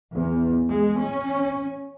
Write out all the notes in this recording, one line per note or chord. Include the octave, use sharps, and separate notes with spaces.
E2
G#3
C#4